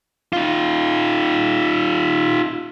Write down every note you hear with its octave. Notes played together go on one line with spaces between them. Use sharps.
D#4 F4